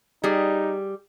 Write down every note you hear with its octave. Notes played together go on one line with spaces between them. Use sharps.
G3 D#4 G4 G#4